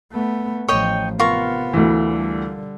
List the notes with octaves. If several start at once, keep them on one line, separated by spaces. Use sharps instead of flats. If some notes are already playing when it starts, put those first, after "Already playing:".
A3 B3
A1 F3 C#5 D#5 G5
C3 B3 F4 A#4 C#6
D2 E3
D3 G3